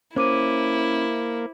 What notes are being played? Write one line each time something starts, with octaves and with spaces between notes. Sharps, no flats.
A#3 C#4 E4 C5 D6 D#7